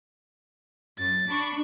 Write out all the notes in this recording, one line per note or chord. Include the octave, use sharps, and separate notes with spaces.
F#2 A6
D4 B5 C#6